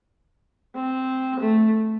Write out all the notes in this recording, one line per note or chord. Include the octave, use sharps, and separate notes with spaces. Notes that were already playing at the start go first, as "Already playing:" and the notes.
C4
A3